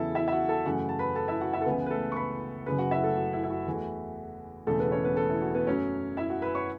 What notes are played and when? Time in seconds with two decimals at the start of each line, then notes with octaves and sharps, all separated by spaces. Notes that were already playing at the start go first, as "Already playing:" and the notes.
Already playing: E2 C#3 F#3 B3 E4 A4 E5 A5
0.15 E4 E5
0.28 E5
0.32 F#4 F#5
0.49 A4 A5
0.65 F#2 C#3 E3 A3 F#4 F#5
0.89 A5
0.99 B4 B5
1.15 A4 A5
1.28 E4 E5
1.41 F#4 F#5
1.53 E4 E5
1.61 A4
1.66 C#2 C#3 E3 B3 B4
1.86 B4
1.90 A3 A4
2.12 C#6
2.16 B4 B5
2.66 F#1 F#2 C#3 B4 B5
2.78 F#4 F#5
2.91 E4 E5
3.03 A3 A4
3.17 F#4
3.33 E4
3.43 E4
3.50 F#4
3.66 E2 E3 A3
4.67 E1 E2 C#3 A3 A4
4.79 B3 B4
4.92 C#4 C#5
5.04 B3 B4
5.17 A3 A4
5.30 E4
5.42 F#4
5.54 B3 B4
5.67 F#2 F#3 A3 C#4 C#5
6.17 E4 E5
6.30 F#4 F#5
6.42 B4 B5
6.55 C#5 C#6